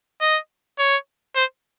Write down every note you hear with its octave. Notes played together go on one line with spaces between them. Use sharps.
D#5
C#5
C5